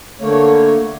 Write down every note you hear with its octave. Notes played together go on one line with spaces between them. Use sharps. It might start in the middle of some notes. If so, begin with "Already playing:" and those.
D3 A3 A#3 C#5